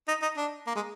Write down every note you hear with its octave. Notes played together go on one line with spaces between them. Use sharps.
D#4
D#4
D4
A#3
G#3